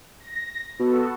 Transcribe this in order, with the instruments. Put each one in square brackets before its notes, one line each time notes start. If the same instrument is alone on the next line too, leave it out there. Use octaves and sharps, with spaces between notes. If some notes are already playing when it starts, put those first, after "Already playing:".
[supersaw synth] A#6
[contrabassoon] B2 [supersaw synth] B3 F#4 A4